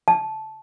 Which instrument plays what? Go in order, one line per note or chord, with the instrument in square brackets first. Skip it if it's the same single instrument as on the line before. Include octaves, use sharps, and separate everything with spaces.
[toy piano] A5